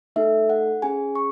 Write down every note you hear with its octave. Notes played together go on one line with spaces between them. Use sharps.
A3 D#4 A4 E5
F#5
C#4 G#4 G#5
C#6